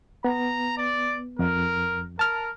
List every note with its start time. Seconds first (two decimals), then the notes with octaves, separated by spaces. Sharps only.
0.25 B3 A#5
0.77 D5
1.39 F2 A#4
2.19 A#4 A5 F6